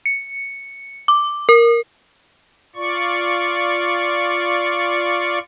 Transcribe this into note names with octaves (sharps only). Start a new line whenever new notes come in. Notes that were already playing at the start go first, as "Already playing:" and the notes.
C#7
D6
A#4
F4 D5 C#6